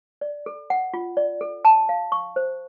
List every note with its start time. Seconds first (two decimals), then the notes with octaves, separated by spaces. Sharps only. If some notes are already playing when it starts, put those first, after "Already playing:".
0.21 D5
0.46 A4
0.70 F#5
0.94 F4
1.17 D5
1.41 A4
1.65 A5
1.89 F5
2.12 C#6
2.36 C5